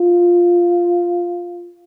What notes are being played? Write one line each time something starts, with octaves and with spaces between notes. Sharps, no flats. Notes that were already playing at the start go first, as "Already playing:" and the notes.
Already playing: F4